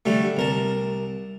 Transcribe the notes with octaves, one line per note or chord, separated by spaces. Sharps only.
D3 G3 A3
C2 A#4 A5